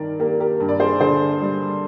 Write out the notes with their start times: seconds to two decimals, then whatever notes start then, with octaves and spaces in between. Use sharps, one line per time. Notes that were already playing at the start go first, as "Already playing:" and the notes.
Already playing: G2 D#3 A#4 D5
0.19 A#3 G4 A#4
0.40 G4 A#4
0.60 G2
0.69 D5
0.79 G#4 C5
1.00 D3 G#4 C5
1.41 G3